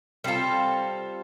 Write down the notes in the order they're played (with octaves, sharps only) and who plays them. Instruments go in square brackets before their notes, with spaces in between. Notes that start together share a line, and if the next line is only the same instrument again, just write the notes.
[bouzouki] G3 C4 F4 A4